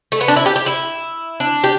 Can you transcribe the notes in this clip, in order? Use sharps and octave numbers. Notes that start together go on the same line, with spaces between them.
A3
B3
D4
E4
G4
G4
E4
D4
G4